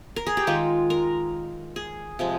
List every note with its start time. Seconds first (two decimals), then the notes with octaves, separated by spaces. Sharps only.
0.16 A#4
0.27 G#4
0.37 G4
0.47 D#3 G#3 F4
0.90 A#4
1.76 G#4
2.19 C3 F3 G#3